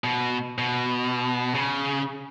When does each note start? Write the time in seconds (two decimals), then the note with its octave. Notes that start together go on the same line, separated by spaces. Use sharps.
0.04 B2
0.58 B2
1.54 C#3